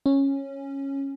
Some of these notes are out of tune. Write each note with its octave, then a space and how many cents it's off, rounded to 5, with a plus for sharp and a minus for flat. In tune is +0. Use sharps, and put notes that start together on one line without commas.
C#4 -10